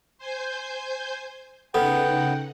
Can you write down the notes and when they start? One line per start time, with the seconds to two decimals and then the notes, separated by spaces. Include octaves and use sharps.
0.18 C5 G#5 G6
1.74 C#3 B3 D#4 A4 B4 F#5 G5